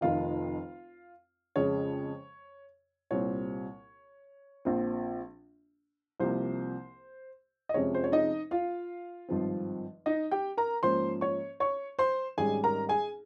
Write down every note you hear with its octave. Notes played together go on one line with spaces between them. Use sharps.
F1 F2 D#3 F4 F5
F2 C#3 G#3 C#5
C2 A#2 G3 C4 C#5
A#1 A#2 F3 C4
C2 C3 F3 A#3 C5
D#5
F2 C3 F3 G#3 C#4 C#5
C5
C#5
D#4 D#5
F4 F5
G#1 G2 F3 C4
D#4 D#5
G4 G5
A#4 A#5
G#2 F3 A#3 C#4 C5 C6
C#5 C#6
C#5 C#6
C5 C6
G#1 G#2 G3 C#4 G#4 G#5
A#4 A#5
G#4 G#5